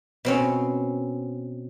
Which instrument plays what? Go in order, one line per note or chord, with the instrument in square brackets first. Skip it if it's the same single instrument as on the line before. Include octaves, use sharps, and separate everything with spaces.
[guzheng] B2 C4 C#4